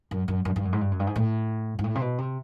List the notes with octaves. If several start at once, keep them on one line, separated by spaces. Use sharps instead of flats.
F#2
F#2
F#2
G2
F#2
G#2
G2
F#2
G2
G#2
A2
G#2
A2
C3
B2
C3